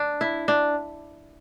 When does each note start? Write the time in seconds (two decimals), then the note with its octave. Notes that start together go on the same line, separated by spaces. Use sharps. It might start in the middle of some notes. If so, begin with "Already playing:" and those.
Already playing: D4
0.21 E4
0.48 D4